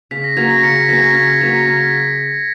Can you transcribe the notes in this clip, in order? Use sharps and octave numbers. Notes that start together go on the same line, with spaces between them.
C#3 B6
A#6
F#3 A#3 C#4 G#6
A#6
C#3 A#6 C#7
B6
F#3 A#3 C#4 A#6
G#6
C#3 G#6
G#6
F#3 A#3 C#4 B6
A#6
C#3